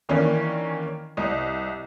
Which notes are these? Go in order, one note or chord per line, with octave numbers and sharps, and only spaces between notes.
D#3 E3 A#3 C#4 D4
C2 D#5